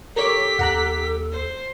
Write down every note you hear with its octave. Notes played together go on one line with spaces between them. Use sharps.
G4 A4 A#4 C#5 D6 B6
D#2 F#5 A#5 F#6
C5